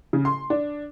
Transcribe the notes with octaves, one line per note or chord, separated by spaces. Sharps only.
C#3
C6
D4